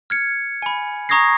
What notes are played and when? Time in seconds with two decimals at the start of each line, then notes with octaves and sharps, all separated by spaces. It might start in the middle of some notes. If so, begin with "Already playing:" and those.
0.10 F6 G#6 C#7
0.62 G#5 B5
1.09 A#5 C#6 D#6 G#6 A#6 C7